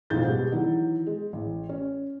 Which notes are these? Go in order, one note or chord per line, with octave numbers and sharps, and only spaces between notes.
B1 F2 G#2 G6 A6
B2 G3 G#3
D#3 E3 F#3
G#3
A1
C#4